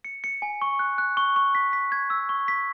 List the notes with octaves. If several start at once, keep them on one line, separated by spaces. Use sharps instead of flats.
C#7
C#7
G#5
C#6
F#6
F#6
C#6
C#6
B6
B6
G#6
E6
C#6
B6